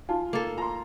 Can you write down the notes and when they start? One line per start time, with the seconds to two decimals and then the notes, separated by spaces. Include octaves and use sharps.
0.09 D#4 F4 A5
0.33 A#3 A4
0.58 F4 A#5 C6